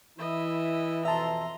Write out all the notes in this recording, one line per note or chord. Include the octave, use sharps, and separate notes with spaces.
E3 E4 D#5 E5
F2 B2 E5 A5 A#5 C6